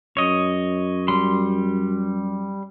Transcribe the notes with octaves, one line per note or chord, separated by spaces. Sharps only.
F#2 C#5 D#5
G3 C6